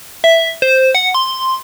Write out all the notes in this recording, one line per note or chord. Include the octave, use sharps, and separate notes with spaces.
E5
C5
F#5
C6